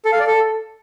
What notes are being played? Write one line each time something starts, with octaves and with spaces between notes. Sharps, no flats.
A4
F5
D5
A4